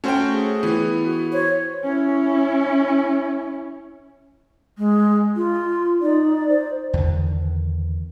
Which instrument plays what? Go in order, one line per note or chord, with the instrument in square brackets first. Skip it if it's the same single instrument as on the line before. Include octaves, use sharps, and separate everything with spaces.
[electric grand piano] A3 F#4 C5 [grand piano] C#4 G5
[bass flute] G#4
[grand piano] E3 [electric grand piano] B3
[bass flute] F#4
[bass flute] C5 [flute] C#5
[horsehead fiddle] C#4 E4
[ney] G#3
F4
[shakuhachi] D#4 [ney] D5
[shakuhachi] C5
[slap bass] E2 D3 D#3